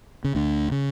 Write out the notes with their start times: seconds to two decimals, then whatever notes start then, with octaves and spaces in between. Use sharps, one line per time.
0.24 C#3
0.35 D2 D3
0.72 C#3